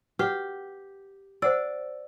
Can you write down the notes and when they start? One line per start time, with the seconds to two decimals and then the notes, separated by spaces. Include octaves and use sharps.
0.19 G4 B4 F#5 C#6
1.42 C5 D5 F#5 E6